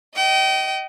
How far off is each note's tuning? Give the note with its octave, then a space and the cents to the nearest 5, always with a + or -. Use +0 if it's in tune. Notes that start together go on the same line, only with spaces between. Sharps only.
D#5 +0 G5 -35